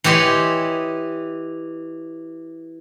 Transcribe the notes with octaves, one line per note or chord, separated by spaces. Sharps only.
E3 G4 C#5 D#5 C6